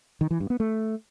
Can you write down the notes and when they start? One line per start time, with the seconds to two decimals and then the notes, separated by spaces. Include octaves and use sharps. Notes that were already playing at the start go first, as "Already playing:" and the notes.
0.21 D#3
0.31 E3
0.40 G2
0.50 B3
0.60 A3